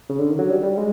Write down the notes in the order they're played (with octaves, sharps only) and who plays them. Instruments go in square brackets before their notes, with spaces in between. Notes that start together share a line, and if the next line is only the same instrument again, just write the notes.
[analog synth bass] C#3
D3
D#3
F#3
G3
G3
G#3